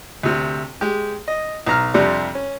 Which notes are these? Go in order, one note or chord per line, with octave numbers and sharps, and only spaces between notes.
D2 C3
G#3 G4
D#5
B1 A#5 F6
F2 C3 G3 D4
C#4